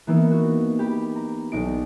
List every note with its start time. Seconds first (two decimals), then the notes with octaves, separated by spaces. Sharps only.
0.07 E3 A#3 B3 D#4 A#4 E6
0.31 F#4
0.79 G4 B5
1.16 A#5
1.52 B1 D4 D#4 D7